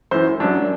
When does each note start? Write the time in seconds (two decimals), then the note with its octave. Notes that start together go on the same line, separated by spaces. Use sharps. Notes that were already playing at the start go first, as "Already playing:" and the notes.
0.11 F#2 E3 C5
0.40 F#2 F#3 D4